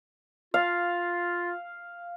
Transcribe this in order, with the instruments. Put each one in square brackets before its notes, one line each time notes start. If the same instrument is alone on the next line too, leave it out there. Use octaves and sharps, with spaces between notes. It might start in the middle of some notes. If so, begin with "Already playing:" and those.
[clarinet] F4 [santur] F5